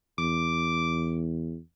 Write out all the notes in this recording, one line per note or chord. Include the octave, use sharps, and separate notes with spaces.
E2 D6